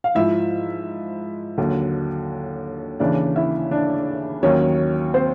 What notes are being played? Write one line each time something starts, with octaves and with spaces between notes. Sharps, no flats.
F5
G#2 F3 E4 E5
D#2 D3 F#3
D#2 C#3 E3 D4 D5
E4 E5
D4 D5
D#2 D#3 F#3 C#4 C#5
C4 C5